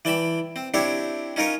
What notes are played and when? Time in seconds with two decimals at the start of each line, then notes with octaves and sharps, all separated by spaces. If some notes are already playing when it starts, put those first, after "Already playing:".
0.05 E3 D5 G5 A5 B5
0.56 C4
0.74 C4 D4 E4 G4 C#5 D5
1.36 C#4 D#4 F4 A#4 C#5